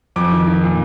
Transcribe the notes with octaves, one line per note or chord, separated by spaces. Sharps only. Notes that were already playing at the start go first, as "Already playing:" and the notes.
F2 D6
D#3
D#3
A#2